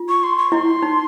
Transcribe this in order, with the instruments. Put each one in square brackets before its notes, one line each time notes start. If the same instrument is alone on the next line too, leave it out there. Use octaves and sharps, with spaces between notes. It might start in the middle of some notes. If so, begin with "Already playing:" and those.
Already playing: [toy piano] F4
[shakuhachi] C#6
C6
C#6
[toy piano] E4 [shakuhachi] C6
[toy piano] D#4